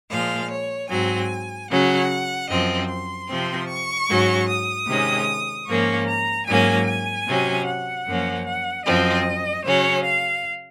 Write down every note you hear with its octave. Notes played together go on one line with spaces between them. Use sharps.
A#2 F3 G#3 F5
C#5
G#2 F#3 C4 G#5
C#3 F#3 C#4 F#5
F#2 F3 C4 D#5
C6
C3 F3 C4
C#6
G#2 F#3 C#4
D#6
C3 D#3 G#3 C#4
G#2 F3 A#3 C#4 C#6
A#5
G#2 F#3 A#3 C#4 G#5
G#5
C3 F#3 C#4
F#5
F#2 F3 A#3 C#4
F#5
F#2 F3 C4 D#5
C#3 F#3 C#4 C#5
F5